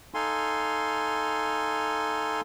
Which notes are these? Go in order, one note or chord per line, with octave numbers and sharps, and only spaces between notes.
D#4 A4 F5 G#5 C6